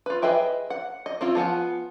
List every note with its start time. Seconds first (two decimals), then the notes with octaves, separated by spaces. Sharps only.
0.06 F4 B4
0.22 G#4 B4 D#5 E5 G5
0.70 F#5
1.06 D#5
1.21 C4 E4 F4
1.35 F3 B3 F#5 G#5